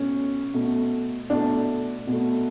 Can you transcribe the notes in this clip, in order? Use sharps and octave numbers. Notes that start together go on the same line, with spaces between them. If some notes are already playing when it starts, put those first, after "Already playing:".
Already playing: B2 A3 C#4
B2 A3
B2 A3 D4
B2 A3